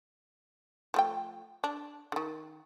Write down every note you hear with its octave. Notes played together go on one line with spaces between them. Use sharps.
F3 A3 G5
D4
D3 D#3